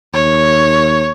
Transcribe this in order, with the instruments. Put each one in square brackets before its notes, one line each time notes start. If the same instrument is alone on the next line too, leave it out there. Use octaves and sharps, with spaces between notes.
[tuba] D#2 [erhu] C#5